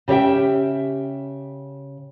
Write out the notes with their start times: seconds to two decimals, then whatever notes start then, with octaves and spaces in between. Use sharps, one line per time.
0.08 C#3 G4 C#5 E5 G5